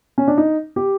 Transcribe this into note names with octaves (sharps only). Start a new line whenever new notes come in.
C#4
D4
D#4
G4